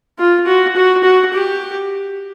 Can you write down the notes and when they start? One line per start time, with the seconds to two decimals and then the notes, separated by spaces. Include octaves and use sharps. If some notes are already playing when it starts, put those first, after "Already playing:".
0.19 F4
0.47 F#4
0.76 F#4
1.04 F#4
1.33 G4